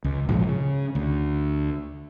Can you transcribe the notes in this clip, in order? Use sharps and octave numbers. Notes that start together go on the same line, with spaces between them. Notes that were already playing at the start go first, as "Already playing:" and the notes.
C#2
A#1 G#2 E3 F3
C#3
D2